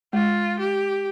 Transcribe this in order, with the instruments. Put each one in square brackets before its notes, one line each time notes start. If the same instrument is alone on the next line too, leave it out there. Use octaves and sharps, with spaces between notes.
[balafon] G#3 [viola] F4
[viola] G4